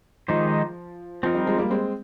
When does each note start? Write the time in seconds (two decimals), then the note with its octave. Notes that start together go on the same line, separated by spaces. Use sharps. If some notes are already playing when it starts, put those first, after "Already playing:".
0.28 D#3 F3 G#3 D#4 G4 C5
1.23 F3 C4 D#4 A#4
1.35 G3
1.47 F3 G#3
1.58 G3 A#3
1.71 G#3 C4